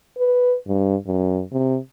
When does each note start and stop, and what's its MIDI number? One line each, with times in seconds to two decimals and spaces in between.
0.18 0.55 71
0.68 0.96 43
1.06 1.42 42
1.52 1.78 48